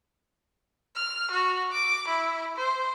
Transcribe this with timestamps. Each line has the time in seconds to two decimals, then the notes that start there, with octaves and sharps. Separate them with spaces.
0.95 F6
1.31 F#4
1.72 D6
2.08 E4
2.56 C5